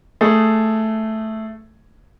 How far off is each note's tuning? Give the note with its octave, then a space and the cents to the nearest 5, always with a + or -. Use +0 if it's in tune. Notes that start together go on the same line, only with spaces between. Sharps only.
A3 +0 G#4 +0